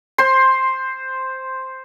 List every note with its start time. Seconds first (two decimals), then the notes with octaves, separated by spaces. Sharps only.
0.18 C5 C6